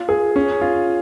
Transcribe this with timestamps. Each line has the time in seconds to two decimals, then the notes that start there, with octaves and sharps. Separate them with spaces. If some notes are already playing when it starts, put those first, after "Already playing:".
Already playing: F4
0.09 G#4
0.36 C#4
0.61 F4